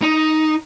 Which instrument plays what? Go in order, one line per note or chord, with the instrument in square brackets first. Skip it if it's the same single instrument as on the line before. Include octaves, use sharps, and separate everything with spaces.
[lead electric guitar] D#4